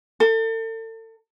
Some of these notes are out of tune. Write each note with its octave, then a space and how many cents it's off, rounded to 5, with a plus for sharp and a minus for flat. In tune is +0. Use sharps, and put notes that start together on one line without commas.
A4 +35